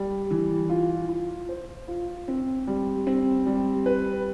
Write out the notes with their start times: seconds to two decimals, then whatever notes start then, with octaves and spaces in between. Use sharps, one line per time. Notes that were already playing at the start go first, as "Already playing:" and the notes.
Already playing: G3
0.31 E3
0.70 F4
1.09 F4
1.49 C5
1.88 F4
2.28 C4
2.67 G3
3.07 C4
3.46 G3
3.86 B4